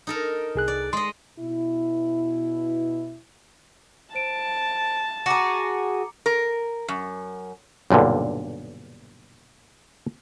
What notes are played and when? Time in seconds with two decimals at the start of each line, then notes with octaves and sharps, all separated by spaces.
0.07 D#4 A4 A#4
0.55 C2 G#4 F#6
0.68 D5
0.93 G#3 D#5 C6
1.38 B2 E4
4.15 C5 A5 D7 E7
5.26 F#4 G#4 A#5 D6 C#7
6.26 A#4
6.88 F#2
7.90 B1 G2 A#2 D3